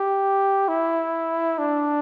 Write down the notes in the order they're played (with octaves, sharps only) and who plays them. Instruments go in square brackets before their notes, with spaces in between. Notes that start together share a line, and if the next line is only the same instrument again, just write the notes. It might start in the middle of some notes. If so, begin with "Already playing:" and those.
Already playing: [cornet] G4
E4
D4